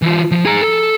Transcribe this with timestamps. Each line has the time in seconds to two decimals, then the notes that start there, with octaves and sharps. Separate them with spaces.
0.02 E3 F4
0.31 F3
0.45 G#4 A#5
0.61 A4